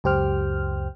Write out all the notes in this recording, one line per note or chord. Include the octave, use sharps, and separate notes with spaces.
C#2 F#2 G4 C5 G5 F6